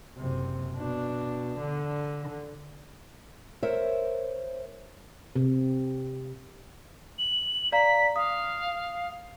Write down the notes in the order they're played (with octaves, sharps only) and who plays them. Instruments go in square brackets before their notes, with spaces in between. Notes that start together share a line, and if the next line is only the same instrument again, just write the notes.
[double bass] F#1 C3
B2 D4
D3
[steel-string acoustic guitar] A#4 C5 C#5 E5
[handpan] C3
[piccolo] F#7
[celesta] D5 F5 A#5 [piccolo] B6
[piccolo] F5 [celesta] D#6